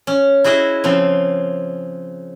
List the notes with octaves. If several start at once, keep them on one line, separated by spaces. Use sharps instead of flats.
C#4
E4 F#4 G#4 D#5 E5
C#3 F3 C4